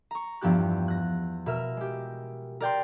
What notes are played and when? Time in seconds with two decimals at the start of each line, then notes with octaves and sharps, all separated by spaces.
0.11 A#5 C#6
0.41 E2 G2 F3 B3 G4 F#6
0.88 F#6 A#6
1.46 B2 A#4 E5 F6
1.77 G#3 G4
2.61 A#4 D5 G5 C6